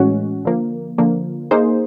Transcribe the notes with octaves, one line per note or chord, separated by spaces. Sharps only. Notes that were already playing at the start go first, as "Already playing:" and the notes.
Already playing: A2 E3 G#3 C#4 F#4
D3 F3 A#3
D3 F3 A#3
A#3 D#4 G#4 C5